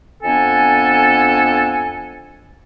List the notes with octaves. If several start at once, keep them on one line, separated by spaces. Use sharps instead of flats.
F2 B3 D4 A4 G#5